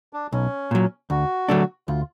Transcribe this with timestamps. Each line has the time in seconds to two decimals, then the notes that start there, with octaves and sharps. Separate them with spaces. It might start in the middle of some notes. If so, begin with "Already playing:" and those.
0.13 D4
0.32 B1 C#4
0.71 A#2 F#3
1.10 D2 F#4
1.49 D3 F#3 A3 D4
1.88 D2 F4